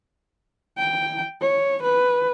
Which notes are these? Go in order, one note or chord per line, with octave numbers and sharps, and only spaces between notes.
G5
C#5
B4